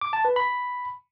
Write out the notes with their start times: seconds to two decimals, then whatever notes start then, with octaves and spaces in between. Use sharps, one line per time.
0.01 D6
0.13 A5
0.25 B4
0.36 B5